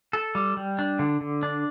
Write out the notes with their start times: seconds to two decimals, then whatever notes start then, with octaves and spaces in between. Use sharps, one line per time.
0.13 A4
0.35 G3
0.57 G3
0.79 D4
0.99 D3
1.21 D3
1.43 D4